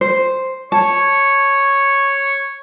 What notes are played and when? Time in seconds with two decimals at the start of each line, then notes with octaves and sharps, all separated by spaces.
0.01 C5
0.72 C#5 A5 C#6